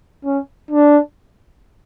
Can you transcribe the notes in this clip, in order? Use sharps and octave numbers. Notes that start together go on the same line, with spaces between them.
C#4
D4